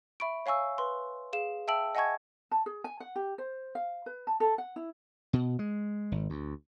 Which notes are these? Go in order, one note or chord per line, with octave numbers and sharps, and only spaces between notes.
E5 B5 C#6 D7
C#5 F5 G#5 C#6 E6
B4 C6
G#4 F5 E7
E5 G5 A5 E6 D7 F#7
D#5 F#5 G#5 A5 C#6 G#6
A5
G#4
G#5
F#5
G4
C5
F5
B4
A5
A4
F#5
E4
B2
G#3
G#1
D2